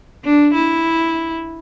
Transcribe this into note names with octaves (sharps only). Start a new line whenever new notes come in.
D4
E4